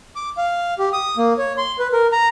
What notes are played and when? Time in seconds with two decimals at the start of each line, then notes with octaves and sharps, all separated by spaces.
0.16 D6
0.38 F5
0.79 G4
0.93 D#6
1.17 A#3
1.38 C#5
1.58 C6
1.79 B4
1.93 A#4
2.12 A#5